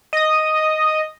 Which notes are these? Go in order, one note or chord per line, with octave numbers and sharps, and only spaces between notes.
D#5 D#6